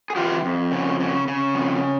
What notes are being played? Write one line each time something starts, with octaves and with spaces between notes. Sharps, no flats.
G#4
E3 F4 G4
F2
C#3
C#3
C#3
F2